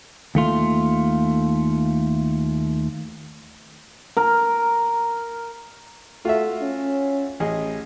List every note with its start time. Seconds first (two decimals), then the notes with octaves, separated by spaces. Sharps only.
0.35 D#2 A3 F4
4.17 A#4
6.25 A3 F4 F#4 E5
6.61 C#4
7.40 A1 G#4 D#5